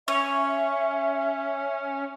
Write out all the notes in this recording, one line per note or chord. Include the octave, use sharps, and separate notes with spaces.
C#4 C#5 E5